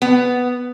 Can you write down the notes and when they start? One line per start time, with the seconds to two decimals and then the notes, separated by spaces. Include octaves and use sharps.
0.02 B3